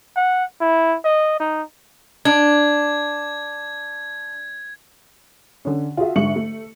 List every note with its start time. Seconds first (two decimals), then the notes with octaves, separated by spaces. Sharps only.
0.16 F#5
0.61 E4
1.05 D#5
1.40 D#4
2.25 D4 G#6
5.65 D3 C#4
5.97 F4 F#4 G#4 E5
6.16 G#2 D3 E5 C#6 C#7 F#7
6.36 A3